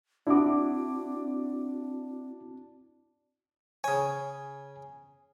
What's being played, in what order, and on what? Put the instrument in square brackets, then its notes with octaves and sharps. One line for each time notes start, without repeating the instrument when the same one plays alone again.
[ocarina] C4 [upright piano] D4 D6 [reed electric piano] E4 F#4
[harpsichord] C#3 C#5 [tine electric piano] G#5